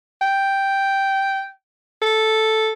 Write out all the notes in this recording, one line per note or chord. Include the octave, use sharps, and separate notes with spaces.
G5
A4